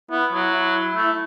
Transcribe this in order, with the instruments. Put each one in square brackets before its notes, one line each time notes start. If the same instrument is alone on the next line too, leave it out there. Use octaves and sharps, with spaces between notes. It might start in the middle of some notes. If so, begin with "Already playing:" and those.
[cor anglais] B3 [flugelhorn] E4
[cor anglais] F#3
[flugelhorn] E4
[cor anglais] A3